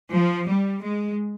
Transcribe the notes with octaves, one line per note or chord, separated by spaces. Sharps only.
F3
G3
G#3